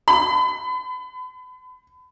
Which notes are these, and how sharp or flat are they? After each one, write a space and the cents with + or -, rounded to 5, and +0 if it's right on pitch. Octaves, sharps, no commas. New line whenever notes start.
B5 +35